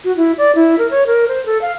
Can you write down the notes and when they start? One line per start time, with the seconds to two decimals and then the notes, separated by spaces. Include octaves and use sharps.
0.05 F#4
0.17 E4
0.38 D5
0.55 E4
0.79 A#4
0.91 C#5
1.07 A#4
1.28 C5
1.46 A4
1.61 F5